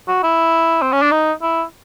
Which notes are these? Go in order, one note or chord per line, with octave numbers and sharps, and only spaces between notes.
F#4
E4
C4
C#4
D4
D#4
E4